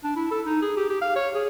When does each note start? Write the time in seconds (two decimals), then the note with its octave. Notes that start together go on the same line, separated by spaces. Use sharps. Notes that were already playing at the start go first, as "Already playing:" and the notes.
0.04 D4
0.16 E4
0.31 A4
0.46 D#4
0.62 G#4
0.77 G4
0.89 G4
1.01 F5
1.16 C#5
1.35 G#4